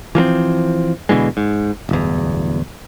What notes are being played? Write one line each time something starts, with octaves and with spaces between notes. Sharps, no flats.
E3 F3 A#3 C4
B2 D3 E3 G#3
G#2
D1 G1 E2